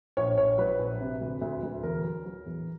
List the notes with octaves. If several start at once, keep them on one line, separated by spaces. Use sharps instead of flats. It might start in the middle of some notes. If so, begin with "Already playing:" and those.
A#1 C#5
A#1 C#5
F#3 B4
A#1
C3
D2
D2
D2
E2 A#4
F#3
F#3
E2